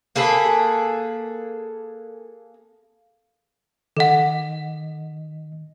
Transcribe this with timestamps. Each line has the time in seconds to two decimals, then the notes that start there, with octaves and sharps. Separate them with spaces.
0.16 A#3 G#4 A4 B4
3.97 D#3 A4 D#5 F#5